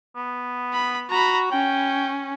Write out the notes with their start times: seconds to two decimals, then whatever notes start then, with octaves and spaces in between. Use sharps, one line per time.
0.16 B3
0.73 B5
1.10 F#4 A#5 B5
1.51 C#4 G5